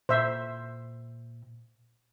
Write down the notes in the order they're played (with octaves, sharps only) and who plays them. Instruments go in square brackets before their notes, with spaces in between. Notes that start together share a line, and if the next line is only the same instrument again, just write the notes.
[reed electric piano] A#2 [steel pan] C5 E5